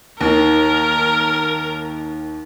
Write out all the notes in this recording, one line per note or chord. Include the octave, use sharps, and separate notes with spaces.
D#2 D#3 A#4